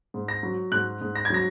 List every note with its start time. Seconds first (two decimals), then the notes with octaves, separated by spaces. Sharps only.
0.14 G#2
0.28 A#6
0.43 F#3
0.72 G#2 F#6
1.01 G#2
1.16 A#6
1.25 G#6
1.30 F#3 A#6